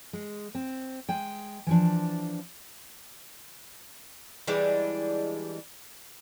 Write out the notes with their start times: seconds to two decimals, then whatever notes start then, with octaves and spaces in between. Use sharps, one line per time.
0.13 G#3
0.55 C4
1.09 G#3 G5
1.67 E3 F3 D4
4.47 E3 G3 G#3 D4